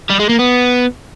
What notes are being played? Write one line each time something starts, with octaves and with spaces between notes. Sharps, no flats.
G3
G#3
A#3
B3